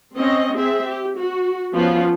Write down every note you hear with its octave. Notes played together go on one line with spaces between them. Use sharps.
C4 C#4 D#5
C4 G#4 E5
G4
F#4
F3 B3 C#4 F4